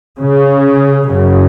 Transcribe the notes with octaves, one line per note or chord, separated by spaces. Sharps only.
C#3
F#2 C#3